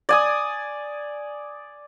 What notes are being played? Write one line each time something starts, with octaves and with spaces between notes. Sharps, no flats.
D5 G#5 D#6